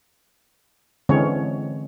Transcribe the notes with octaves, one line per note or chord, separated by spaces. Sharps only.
D3 E3 G#3 C4 C#4 C#5